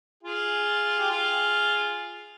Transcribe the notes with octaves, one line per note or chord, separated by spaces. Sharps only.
F4 G#4
G4
F4 G#4